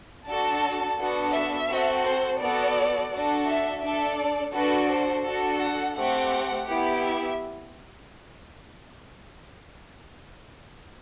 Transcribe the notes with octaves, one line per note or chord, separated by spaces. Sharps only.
D4 F#4 A4 A5
B3 D4 F#4 A4
E5
C4 F#4 A4
C5
B3 F#4 A4 D5
D4 F#4 A4
E5
D4 A4 E5
D5
D4 F#4 A4 B4
C5
D4 F#4 A4
F#5
A3 C4 G4 F#5
B3 E4 G4
E5